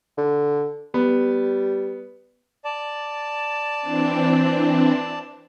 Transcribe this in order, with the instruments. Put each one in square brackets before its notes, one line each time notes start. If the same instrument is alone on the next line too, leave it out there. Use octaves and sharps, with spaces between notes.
[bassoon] D3
[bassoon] G3 [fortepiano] B3
[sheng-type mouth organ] D5 A5
[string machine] E3 C4 D4